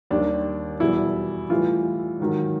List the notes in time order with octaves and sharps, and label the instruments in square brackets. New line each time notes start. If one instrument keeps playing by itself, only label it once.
[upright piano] D#2 D#3 G3 D4
E2 B2 G3 E4
A2 E3 G3 F4
G#2 D#3 F#3